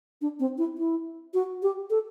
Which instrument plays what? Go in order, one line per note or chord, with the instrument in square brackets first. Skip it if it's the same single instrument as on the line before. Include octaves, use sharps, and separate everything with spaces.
[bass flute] D4
C4
E4
E4
F#4
G4
A4